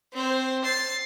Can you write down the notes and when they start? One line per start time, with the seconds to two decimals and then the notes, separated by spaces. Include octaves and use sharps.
0.13 C4 C5
0.64 A6 C7